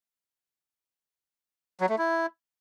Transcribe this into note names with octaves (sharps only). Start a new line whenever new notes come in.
F#3
A3
E4